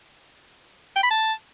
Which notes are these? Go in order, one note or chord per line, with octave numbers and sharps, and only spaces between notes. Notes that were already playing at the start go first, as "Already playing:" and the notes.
G5
B5
A5